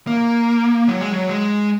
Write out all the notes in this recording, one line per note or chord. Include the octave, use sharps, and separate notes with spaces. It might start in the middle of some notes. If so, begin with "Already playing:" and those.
A#3
F#3
G#3
F#3
G#3